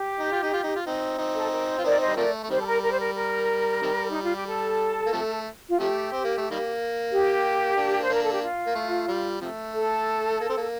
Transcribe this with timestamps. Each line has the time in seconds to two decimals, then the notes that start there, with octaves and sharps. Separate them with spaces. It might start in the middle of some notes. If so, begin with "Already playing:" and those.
Already playing: G4
0.19 D#4
0.32 F4
0.42 D#4
0.53 F4
0.64 D#4
0.76 F4
0.86 C4 D#4
1.18 C4 D#4
1.34 A4
1.52 A#4
1.68 C5
1.78 F4
1.84 C4 D#4 A#4 D5
2.01 C5 D#5
2.07 G3
2.17 C3 F3 A3 A#4 D5
2.43 A3
2.50 C3 D#3 G3 C5
2.60 A4
2.66 A#4
2.84 A#4
2.91 C5
2.99 A#4
3.15 A#4
3.82 C3 D#3 G3
4.10 D#4
4.23 F4
4.35 G4
4.47 A4
5.06 A#3
5.13 C3 F3 A3
5.69 F4
5.80 C3 F3 A3 G4
6.12 C4
6.24 A#3
6.38 A3
6.51 D#3 G3 A#3
7.11 G4
7.77 A#3 D4
8.03 C5
8.10 A#3 D4 A#4
8.22 A4
8.32 G4
8.43 F4
8.67 A#3
8.75 A3
9.08 G3
9.41 C3 F3 A3
9.74 A4
10.40 A#3
10.49 C4
10.57 A#3